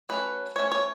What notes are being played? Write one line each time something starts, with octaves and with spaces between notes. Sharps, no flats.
F#3 A3 C#4 B4
E3 A3 C#4 C#5
C#5